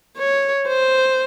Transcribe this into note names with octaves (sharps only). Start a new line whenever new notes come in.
C#5
C5